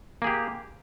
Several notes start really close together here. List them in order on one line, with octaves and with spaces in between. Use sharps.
A#3 G#4 G4